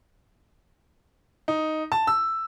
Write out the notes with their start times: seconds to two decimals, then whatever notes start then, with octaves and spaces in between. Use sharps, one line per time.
1.48 D#4
1.92 A5
2.07 E6